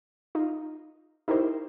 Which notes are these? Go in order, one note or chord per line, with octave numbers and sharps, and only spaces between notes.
D#4 F4
D#4 E4 G4 A#4 C5